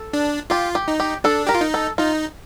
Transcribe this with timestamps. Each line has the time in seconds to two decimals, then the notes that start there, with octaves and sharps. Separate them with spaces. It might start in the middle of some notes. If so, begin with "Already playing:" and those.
Already playing: A4
0.13 D4
0.50 F4 G4
0.75 G4
0.88 D#4
1.00 G4
1.24 D4 A4
1.47 G4 A#4
1.55 F4
1.61 D#4
1.74 A4
1.98 D#4 F4